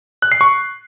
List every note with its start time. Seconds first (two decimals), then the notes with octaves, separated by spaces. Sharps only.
0.22 F#6
0.32 C7
0.41 C#6